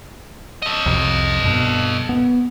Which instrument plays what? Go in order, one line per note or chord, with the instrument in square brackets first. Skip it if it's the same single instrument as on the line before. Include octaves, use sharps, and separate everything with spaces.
[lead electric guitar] A4 D#5
[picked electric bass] C2 F2 C3
G2 B2
B3